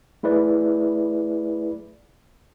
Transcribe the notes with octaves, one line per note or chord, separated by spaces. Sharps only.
A3 E4 G#4 B4 D5